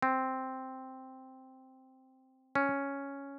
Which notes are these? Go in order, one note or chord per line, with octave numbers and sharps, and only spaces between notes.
C4
C#4